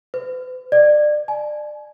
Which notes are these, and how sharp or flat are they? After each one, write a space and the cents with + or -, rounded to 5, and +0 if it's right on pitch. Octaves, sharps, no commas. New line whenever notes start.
B4 +45
D5 +25
G#5 +35